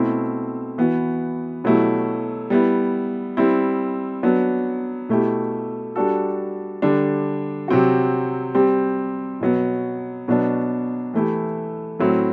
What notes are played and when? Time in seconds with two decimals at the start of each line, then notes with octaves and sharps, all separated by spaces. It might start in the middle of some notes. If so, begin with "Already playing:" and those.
Already playing: B2 A3 C4 E4
0.78 E3 B3 F#4
1.64 B2 F#3 A3 E4 G4
2.50 G3 B3 E4
3.37 G3 C4 E4
4.23 F#3 B3 D4
5.09 B2 A3 E4 G4
5.96 G3 D4 F#4 A4
6.82 D3 G3 D4
7.68 C3 F#3 C4 F#4
8.55 G3 C4 G4
9.41 B2 F#3 B3
10.28 B2 F#3 B3 D4
11.14 E3 A3 E4 G4
12.00 A2 F#3 C4 E4